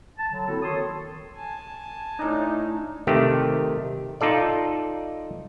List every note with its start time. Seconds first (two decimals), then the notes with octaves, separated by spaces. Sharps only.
0.18 A5
0.31 D3 F#3
0.46 A#3 C4 E4 F#4 A4
0.62 D#3 A4 C#5 A5 C6 D#6
1.37 G#5 A5
2.19 A2 D4 D#4
3.07 C3 D#3 A3 G4
4.21 D#4 F4 A4 D5